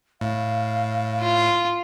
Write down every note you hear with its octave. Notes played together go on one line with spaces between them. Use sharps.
A2 F5
F4